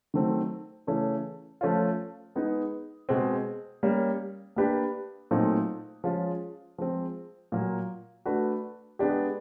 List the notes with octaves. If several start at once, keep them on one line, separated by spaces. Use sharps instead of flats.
D#3 F#3 A3 C4
C#3 E3 A3 C#4
F3 A3 C#4 F4
G#3 B3 D#4 G#4
B2 G#3 C4
G3 A#3 C#4
A#3 D4 G4 B4
A#2 F#3 A3 C4 D#4
F3 G#3 C#4 F4
F3 G#3 C4
A#2 F#3 A#3
A3 D4 F#4 B4
G#3 B3 D4 G4